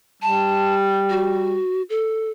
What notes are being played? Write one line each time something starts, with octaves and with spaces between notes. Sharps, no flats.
G3 A5
F#4
A4